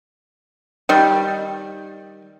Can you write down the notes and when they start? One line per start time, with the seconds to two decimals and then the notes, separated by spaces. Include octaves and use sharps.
0.89 D#3 G3